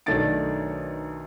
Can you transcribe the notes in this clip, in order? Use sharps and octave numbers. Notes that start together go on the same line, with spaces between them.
B1 D#3 A3 D4 A6 D7